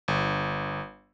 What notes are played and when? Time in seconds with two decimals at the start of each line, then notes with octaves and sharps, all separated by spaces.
0.08 G1